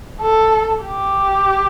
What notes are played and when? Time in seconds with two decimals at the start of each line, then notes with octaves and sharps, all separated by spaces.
0.21 A4
0.84 G4